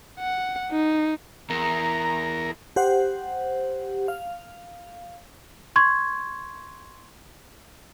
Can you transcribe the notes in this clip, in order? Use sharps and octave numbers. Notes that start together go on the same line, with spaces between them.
F#5
D#4
E2 A#4 A#5
G4 C5 F#5
F5
C6 C#6 G#6